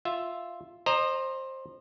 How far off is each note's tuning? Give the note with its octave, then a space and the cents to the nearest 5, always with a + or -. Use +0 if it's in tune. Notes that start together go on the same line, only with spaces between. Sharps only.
F4 +0 E5 +0
C5 +15 D#5 -35 A#5 +0